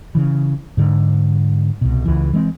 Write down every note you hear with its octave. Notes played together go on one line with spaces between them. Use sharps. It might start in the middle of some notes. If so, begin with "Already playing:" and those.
C#3 E3
G#2 D3
C2 B2
C#2 E3
E3 G#3 C4